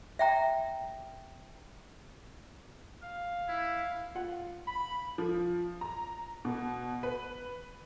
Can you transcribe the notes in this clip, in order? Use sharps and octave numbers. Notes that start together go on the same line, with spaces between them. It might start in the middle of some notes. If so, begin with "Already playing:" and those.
E5 G5 A#5
F5
E4
F4 F#5
B5
F3
A#5
B2
B4